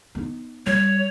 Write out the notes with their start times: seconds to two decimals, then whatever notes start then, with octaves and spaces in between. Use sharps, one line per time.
0.15 B3 D#4
0.67 G3 C#5